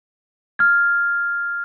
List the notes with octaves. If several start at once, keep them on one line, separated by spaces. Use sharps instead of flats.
F6 G#6